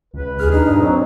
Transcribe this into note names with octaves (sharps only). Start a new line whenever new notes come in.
C#2 B4
D#2 G#4 F6
D4 D#4
G2 A#2
F#3 C4